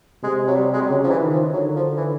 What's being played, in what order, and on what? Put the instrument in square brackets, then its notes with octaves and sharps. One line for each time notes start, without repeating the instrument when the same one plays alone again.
[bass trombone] C3 [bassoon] G#3
[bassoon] F#3
G3
G#3
G3
[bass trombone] C#3 [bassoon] F#3
[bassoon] F3
E3
[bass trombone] D#3
[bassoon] F3
[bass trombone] D3 [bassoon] F#3
[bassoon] F3
E3